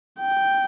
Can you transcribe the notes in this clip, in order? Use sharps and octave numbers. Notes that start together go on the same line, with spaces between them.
G5